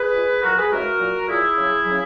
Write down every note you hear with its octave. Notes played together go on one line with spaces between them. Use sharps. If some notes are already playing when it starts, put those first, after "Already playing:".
Already playing: G#4 B4
A#2 G#3
A#2 F#3 F#4 A#4
G#4 B4
C#3 E3 G#3 F#4 A#4
A#2 F#3
A#2 F#3 E4 G#4
C#3 F#3
C#3 F#3